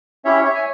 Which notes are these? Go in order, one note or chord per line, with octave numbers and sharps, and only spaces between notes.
C#4 E4 G4 C#5 E5
C#5 E5
G#5